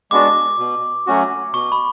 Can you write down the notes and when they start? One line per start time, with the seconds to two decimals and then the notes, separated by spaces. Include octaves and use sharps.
0.11 G#3 B3 D4 F#4 D6
0.58 B2
1.07 F#3 A3 C#4 F#4
1.53 B2 C#6
1.72 B5